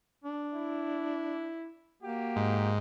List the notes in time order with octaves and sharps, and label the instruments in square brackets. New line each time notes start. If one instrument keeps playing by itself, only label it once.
[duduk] D4
[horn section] E4
[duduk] A#3 [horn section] F#4 G4
[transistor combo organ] G#2